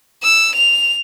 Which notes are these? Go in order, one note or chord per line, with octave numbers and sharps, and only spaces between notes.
E6
F7